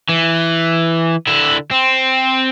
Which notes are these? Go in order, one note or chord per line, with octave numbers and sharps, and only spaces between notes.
E3
D3 E4
C4